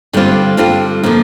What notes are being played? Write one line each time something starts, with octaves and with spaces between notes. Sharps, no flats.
G2 D3 G3 C4 F4
G2 D3 G3 C4 F4
D3 F3 A#3